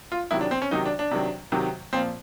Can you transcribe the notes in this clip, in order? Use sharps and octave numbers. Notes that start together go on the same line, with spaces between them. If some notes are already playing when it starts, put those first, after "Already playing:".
F4
C3 D#3 F#3 E4
D4
C4
C#4
C3 D#3 F#3 D#4
D4
D4
C3 D#3 F#3
C3 D#3 F#3
A#2 F3 C4